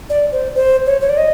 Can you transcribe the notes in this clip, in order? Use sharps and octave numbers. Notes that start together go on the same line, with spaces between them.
D5
C5
C5
C#5
C#5
D5
D#5